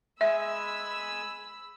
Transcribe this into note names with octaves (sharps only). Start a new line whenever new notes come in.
G#3 E5 G#5 B5 E6